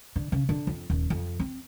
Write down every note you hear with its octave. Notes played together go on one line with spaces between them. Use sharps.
D3
C#3
D3
F2
D#1
F2
C4